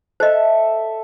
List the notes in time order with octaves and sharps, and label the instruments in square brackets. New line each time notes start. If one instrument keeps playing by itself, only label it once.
[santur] A4 E5 [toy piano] C5 D#5